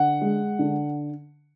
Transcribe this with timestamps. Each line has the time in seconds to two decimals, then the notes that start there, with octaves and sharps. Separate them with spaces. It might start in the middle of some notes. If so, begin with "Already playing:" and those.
Already playing: D3 F#5
0.22 G#3
0.59 D3